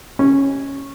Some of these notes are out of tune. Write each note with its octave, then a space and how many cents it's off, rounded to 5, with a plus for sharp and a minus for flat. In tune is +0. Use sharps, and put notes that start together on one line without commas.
C#4 -10